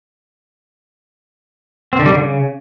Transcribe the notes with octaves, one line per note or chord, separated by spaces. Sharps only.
C4
D3
G3
D3
C#3